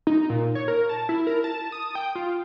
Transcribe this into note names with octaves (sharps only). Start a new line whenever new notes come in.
D#4
A#2
C#5
A#4
A5
E4
A#4
A5
D#6
G5
F4